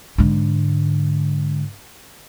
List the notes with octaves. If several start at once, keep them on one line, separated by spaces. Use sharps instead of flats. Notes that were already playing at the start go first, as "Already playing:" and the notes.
G#2 D3